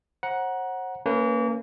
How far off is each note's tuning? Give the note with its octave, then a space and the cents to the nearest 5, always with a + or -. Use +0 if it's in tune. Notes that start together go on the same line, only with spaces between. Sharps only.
C5 +40 F#5 +0 A#5 +25
A#3 -30 C#4 +0 B4 +0